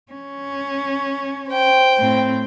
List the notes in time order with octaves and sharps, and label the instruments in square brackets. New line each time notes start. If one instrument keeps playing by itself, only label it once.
[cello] C#4
[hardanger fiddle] C5 G5
[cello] A2 C4